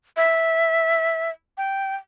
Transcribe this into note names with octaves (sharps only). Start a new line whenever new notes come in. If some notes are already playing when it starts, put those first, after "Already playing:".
E5
G5